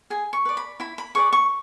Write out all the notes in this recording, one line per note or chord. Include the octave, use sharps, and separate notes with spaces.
G#4 G#5
C#6
B4 D5
B5
E4 B5
B5
G#4 B4 D5 C#6
C#6